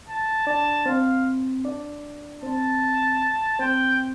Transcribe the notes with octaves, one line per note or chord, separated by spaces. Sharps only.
A5
D4 D5 A5
C4 C5 F5
D4 D5
C4 C5 A5
C4 C5 G5